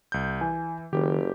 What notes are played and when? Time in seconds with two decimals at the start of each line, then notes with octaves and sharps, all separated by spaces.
0.12 C2 G6
0.41 E3 G#5
0.93 F#1 D#3 G4